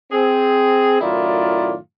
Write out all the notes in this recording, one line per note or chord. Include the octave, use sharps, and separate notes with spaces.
C4 G#4
F#2 A2 D#3 E4 F4 D5